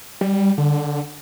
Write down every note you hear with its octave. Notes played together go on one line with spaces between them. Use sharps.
G3
D3